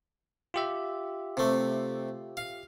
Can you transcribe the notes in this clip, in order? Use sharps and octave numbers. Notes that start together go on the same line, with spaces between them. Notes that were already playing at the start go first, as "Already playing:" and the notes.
F4 G4 E5
C3 A3
F5